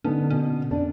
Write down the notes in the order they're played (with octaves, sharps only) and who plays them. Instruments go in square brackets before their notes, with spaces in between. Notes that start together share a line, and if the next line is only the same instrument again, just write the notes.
[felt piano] D3 [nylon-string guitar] B3 D#4 A4 [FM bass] C#4
[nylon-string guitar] B2 [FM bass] C#4
[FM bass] F2 [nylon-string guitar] D4